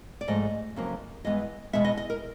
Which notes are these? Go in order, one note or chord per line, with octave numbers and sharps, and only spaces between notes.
D5
G#2 F3 A3 D#5
F2 C#3 F#3 A#3
G2 E3 G#3 B3 D#5
E2 B2 G#3 B3 E5
D#5
D#5
A#4